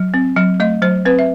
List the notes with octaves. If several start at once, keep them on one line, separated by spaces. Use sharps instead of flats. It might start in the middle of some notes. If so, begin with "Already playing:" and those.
Already playing: F#3
C4
F#3
A3 D#5
F#3 C5
C4 B4
E5